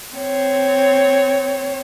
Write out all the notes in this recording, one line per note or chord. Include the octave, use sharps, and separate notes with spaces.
C4 C#5